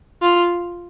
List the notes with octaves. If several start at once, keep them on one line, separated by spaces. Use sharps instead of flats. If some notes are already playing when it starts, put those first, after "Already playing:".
F4